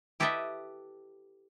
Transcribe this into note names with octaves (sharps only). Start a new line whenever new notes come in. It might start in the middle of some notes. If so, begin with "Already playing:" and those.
E4 G4 A4 B4 D#5 E5